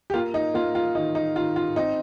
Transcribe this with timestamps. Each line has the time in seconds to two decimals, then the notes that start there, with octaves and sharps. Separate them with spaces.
0.10 G4
0.14 A#3 F4
0.34 D#4
0.54 A#3 F4
0.75 F4
0.95 D#3 D#4
1.15 D#4
1.36 D#3 F4
1.56 F4
1.76 C4 D#4